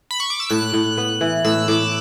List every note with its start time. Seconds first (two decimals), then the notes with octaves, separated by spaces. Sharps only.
0.11 B5
0.20 C#6
0.30 D6
0.40 E6
0.50 A2 F#6
0.74 A2
0.98 B3
1.21 E3
1.45 A2 E6
1.68 A2 D6